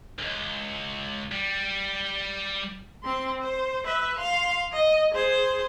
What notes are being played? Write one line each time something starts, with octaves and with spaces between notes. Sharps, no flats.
C#2 G#2
G3
C4 C6
C5
B4 E5
F5 C6
D#5
G#4 C5